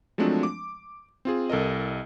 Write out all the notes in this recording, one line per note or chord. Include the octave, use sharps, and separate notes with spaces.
F3 F#3 G#3 A3 C4 D4
D6
C4 F4 G#4
C2 A4 A#4 D#5